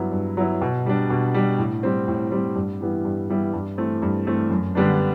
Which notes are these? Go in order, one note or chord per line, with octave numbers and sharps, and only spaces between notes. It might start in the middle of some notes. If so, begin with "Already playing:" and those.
Already playing: G2 F#3 B3 E4
G2
F#3 B3 E4
B2
G3 D4
B2
G3 D4
A2
G3 C4
A2
G3 C4
G2
E3 G3 B3 E4
G2
E3 G3 B3 E4
G2
E3 A3 C4
G2
E3 A3 C4
F#2
D3 G3 B3 D4